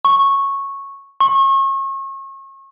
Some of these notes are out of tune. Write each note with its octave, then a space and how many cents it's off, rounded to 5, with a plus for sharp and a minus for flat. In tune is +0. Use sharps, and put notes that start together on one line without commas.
C#6 -10
C#6 -35